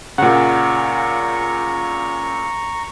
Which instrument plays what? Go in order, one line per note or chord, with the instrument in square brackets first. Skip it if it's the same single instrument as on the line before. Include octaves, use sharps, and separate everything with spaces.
[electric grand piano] A#2 C#3 [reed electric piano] F#5 [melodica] A#5 C#6